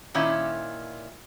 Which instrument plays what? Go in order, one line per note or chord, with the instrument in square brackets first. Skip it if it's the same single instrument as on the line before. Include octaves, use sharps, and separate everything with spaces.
[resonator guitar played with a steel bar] A#2 D#3 C#4 E4 F4